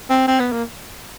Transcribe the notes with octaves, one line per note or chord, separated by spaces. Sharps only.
C4
C4
B3
A#3